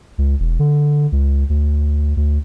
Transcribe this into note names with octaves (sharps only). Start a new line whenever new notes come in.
C#2
E1
D3
C#2
D2
D2